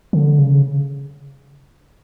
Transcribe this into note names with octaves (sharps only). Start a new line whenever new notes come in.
D3
C#3